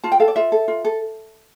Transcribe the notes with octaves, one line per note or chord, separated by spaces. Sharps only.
F4 A5
G5
A4 F5
D5
F4 E5
A4
F4
A4